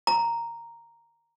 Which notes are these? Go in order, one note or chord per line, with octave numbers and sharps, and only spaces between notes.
A#5